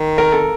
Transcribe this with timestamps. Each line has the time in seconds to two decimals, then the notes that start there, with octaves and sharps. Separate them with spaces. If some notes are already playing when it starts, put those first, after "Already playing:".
Already playing: D#3
0.18 A#4
0.32 A4